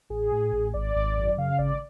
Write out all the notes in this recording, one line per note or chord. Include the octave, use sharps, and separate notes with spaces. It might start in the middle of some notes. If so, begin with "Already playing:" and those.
A1 G#4
A2
A1
G#1 D5
G#1
F#2
C#3 F5
G#1 D5